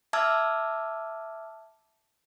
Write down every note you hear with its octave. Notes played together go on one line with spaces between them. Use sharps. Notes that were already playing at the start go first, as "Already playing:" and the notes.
E5 A5 D6 E6 F6 G#6